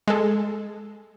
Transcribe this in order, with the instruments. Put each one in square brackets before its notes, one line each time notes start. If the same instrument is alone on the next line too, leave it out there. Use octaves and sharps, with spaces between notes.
[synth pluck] G#3 A4